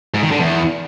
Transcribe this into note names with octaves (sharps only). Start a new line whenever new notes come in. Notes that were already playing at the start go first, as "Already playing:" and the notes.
G#2
D#3
D3
E2